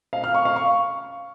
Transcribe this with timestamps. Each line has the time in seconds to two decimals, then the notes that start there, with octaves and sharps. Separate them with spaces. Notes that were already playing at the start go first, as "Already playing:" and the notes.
0.13 F5
0.24 F6
0.35 C#6
0.45 F5
0.56 C#6